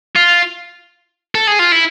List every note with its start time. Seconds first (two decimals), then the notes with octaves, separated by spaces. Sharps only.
0.16 F4
1.35 A4
1.47 G#4
1.59 F4
1.72 E4